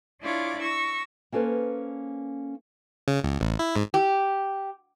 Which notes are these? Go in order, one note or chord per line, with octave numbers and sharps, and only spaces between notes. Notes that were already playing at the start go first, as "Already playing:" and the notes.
D4 E4 F4 C#5 D6
C#6 E6 A#6
A#3 C#4 A4 B4 C5
C#3
C#2
A1
E4
G#2
G4